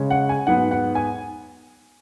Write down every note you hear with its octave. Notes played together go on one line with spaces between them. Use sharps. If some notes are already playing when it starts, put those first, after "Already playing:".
Already playing: C#3 G#3 C#4
F#5
G#5
G#2 F#3 B3 F#5
F#5
G#5